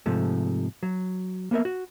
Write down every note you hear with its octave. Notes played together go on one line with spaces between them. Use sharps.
G#2 C3 F3 A3
F#3
A#3 B3 A#4 E5
F#4